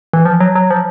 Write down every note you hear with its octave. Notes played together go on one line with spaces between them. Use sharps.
E3
F3
F#3
F#3
F3